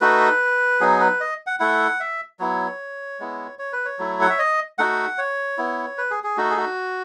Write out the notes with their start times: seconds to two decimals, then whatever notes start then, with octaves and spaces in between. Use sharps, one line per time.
0.01 A3 D#4 F#4 B4
0.80 F#3 B3 D#4 G#4
1.01 B4
1.20 D#5
1.47 F#5
1.60 A3 E4 F#5
2.00 E5
2.39 F#3 B3 E4 C#5
3.20 G#3 B3 E4
3.59 C#5
3.73 B4
3.85 C#5
3.99 F#3 A3 E4
4.21 F#5
4.30 E5
4.39 D#5
4.78 A3 D#4 F#4 F#5
5.18 C#5
5.58 B3 E4
5.98 B4
6.11 G#4
6.24 G#4
6.37 A3 D#4 F#4
6.50 G#4
6.57 F#4